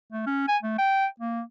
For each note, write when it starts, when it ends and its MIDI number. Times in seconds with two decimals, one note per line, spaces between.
0.13 0.25 57
0.27 0.47 61
0.48 0.58 80
0.63 0.75 57
0.79 1.06 79
1.20 1.42 58